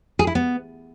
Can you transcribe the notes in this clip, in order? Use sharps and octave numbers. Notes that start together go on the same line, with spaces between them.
G#4
E4
B3